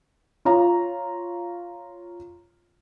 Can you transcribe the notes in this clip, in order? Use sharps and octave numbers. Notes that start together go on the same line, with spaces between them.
F4 C#5 A#5